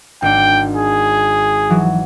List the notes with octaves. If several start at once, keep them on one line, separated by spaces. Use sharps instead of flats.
G#1 D4 G5
G#4
E3 F#3